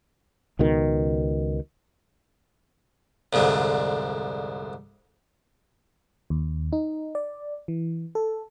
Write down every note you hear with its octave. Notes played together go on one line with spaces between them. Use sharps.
C#2 B2 D#3
C2 F2 G#2 D3
D#2
D#4
D5
E3
A4